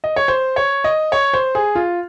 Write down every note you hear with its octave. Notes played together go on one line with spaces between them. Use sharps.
D#5
C#5
C5
C#5
D#5
C#5
C5
G#4
F4